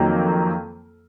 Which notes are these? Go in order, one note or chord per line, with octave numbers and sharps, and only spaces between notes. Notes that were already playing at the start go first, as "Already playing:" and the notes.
Already playing: F2 D#3 F#3 A#3